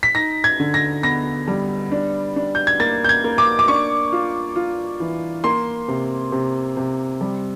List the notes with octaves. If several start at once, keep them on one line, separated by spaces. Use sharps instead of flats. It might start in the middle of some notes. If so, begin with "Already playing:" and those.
B6
D#4 A#6
G#6
D3
A#6
B3 A#6
G3
D4
D4
G6
G#6
A#3 A6
G6
G#6
A#3
D6
D6
D4 C#6
F4
F4
E3
A#3 C6
C3
C3
C3
G3